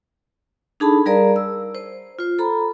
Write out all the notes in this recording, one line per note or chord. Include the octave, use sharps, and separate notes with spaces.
D4 D#4 G#4 A4 A5 B5
G3 G#4 A#4 D5 F5 A#5
E6
C5
F4 C5
A4 A#5 B5